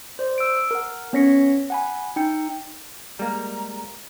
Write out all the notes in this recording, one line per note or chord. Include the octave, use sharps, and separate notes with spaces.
C5 D5
E6 D7
A#4 F#5
B3 C#4 C#5 A#6 B6 C#7
F#5 G#5 B5
D#4 G5 G6 C#7
G3 G#3 A#3 A#5